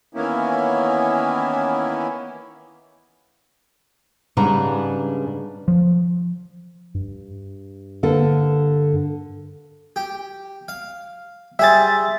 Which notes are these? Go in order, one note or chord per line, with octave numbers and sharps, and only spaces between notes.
D#3 E3 A#3 B3 C#4 E4
G#2 C#3 G3 D4 B4 A#5
F3
G2
D3 A#3 A4
G4
F5
G3 G#4 C5 E5 A6